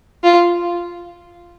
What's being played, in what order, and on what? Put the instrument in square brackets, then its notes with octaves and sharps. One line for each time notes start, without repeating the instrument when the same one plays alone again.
[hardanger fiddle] F4